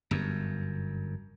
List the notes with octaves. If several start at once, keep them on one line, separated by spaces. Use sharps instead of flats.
G1 F#2